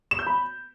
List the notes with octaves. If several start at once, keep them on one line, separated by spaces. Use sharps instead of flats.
E7
G6
B5